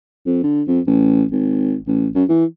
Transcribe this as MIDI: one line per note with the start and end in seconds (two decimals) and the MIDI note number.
0.26 0.41 41
0.43 0.62 50
0.67 0.80 41
0.87 1.24 33
1.31 1.75 32
1.87 2.08 33
2.15 2.24 42
2.29 2.45 52